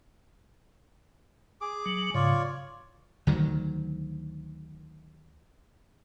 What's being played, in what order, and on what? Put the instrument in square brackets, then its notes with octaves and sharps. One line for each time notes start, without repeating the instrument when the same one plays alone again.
[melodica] G#4 D6
[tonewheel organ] F#3
[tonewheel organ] G#2 C#3 [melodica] F4 C#5 D5
[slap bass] D2 D#3 F#3